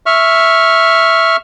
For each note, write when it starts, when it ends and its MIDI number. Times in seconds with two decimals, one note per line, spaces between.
0.06 1.36 76
0.06 1.36 85
0.06 1.36 89